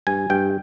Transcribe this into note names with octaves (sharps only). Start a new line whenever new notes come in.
G2 G#5
G2 G5